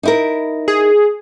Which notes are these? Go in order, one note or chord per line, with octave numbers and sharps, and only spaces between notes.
D#4 E4 A#4
G#4